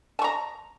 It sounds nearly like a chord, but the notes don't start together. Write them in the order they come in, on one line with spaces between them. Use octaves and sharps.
A5 C#6 A#5